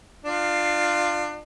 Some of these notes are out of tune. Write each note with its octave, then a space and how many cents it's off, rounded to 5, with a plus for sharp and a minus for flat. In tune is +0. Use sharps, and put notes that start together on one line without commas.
D4 +30 F4 +5